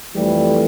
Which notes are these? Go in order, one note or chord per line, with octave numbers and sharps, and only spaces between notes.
F2 E3 G3 A3 G4